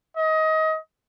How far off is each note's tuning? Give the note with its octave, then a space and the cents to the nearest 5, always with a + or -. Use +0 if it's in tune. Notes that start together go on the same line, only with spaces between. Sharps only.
D#5 +25